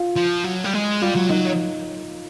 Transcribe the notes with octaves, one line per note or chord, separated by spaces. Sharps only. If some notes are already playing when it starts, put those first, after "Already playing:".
Already playing: F4
F3
F#3
G3
G#3
G3 F4
F#3
F#3 D#4